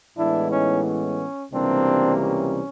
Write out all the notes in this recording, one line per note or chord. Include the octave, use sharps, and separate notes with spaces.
A2 E3 G#3 B3 D4 E4
C#4 D#4
C#4
C#2 C3 E3 G3 A#3 C4 D4
C#4